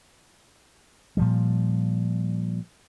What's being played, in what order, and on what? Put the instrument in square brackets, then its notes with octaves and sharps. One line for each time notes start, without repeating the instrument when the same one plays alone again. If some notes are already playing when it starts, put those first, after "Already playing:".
[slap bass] A#2 F3 G3